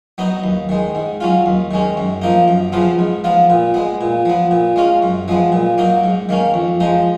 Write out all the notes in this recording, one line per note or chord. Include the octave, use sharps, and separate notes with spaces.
F#3 B3 D#4
D#2
D#3 G#3
G#2
F#3 C#4 F4
D#2
D#3 G#3 C#4
F#2
F3 A#3 D#4
F#2
C#3 F3 B3 F4
G#2
F3 B3 F4
A#2
G#3 B3
A#2
F3 B3
A#2
G#3 C#4 F4
F#2
F3 G#3 B3
A#2
F#3 A#3 D#4
G#2
D#3 A#3 C#4
F2
F3 G#3 D#4